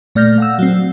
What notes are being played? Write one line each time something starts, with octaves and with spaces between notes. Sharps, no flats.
A#2 A3 D5 F6 G6 A#6
F5 F#5 E6
F#3 C4